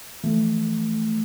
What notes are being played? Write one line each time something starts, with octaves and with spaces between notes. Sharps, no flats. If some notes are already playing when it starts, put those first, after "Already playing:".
E3 F3 A3